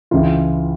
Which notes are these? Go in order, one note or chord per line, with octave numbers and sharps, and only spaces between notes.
C#2 C#3 E3 F4